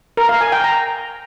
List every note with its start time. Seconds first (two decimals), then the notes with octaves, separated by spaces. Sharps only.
0.17 A#4
0.29 F5
0.41 G#5
0.52 G5
0.64 A#5